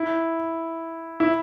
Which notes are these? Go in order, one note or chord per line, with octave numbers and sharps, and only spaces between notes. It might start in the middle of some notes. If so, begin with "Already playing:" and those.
Already playing: E4
E4